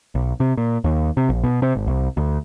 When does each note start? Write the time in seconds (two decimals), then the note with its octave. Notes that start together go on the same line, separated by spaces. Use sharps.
0.15 B1
0.40 C3
0.57 A#2
0.84 D#2
1.17 C3
1.29 A#1
1.43 B2
1.62 C3
1.75 G#1
1.87 C2
2.17 D2